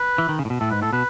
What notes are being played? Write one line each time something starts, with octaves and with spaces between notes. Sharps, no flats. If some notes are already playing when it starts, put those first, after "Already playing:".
Already playing: B4
E3
D#3
C#3
A2
B2
A2 A4
G#2 B4
A2 A4
B2 B4